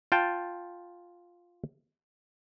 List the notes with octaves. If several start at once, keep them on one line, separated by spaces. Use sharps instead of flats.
F4 G5 A5